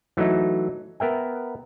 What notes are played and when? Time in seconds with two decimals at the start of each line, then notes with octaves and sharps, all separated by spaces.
0.17 E3 F#3 A3 D#4
1.00 B3 A#4 E5 G5